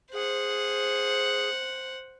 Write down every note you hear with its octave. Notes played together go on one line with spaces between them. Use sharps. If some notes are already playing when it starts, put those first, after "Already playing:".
G#4 C5 F#5